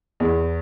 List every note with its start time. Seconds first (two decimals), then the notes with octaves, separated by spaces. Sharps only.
0.20 E2